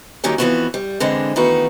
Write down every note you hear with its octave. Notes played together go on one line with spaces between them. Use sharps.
D3 D#3 F#3 G3 A#3 C#4
F2 E3 F3 B3 F4 F#4
G3
D3 E3 G#3 C4 D4
D#3 E3 A3 B3 F#4